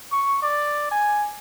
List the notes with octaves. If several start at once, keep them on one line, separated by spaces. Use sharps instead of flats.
C#6
D5
G#5